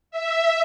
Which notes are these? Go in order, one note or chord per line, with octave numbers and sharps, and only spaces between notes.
E5